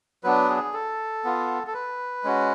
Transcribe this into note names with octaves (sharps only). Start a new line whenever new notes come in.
F#3 B3 D4 B4
G#4
A4
B3 F4
A4
B4
G#3 C#4 F#4